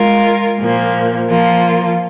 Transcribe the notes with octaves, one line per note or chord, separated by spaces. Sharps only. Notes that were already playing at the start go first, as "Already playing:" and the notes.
Already playing: G#3 F4 A#4
A#2 F3 A#3
F3 A#3 F4